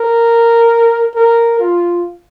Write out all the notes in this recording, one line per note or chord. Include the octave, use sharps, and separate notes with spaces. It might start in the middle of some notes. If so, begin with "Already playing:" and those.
Already playing: A#4
A#4
F4